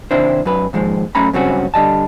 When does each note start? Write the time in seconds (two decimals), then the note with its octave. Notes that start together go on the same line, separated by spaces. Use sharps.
0.11 D#2 C3 D4 E4 C5
0.45 F#2 B4
0.73 D#2 G#2 F3 G#3
1.15 F#2 A3 C#4 A#5 B5
1.33 G2 C#3 F#3 C4 C#4 F#4
1.74 D3 G3 D#5 A5